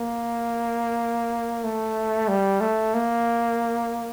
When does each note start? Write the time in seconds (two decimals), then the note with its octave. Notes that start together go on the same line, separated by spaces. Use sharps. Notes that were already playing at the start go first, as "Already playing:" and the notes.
Already playing: A#3
1.64 A3
2.28 G3
2.61 A3
2.94 A#3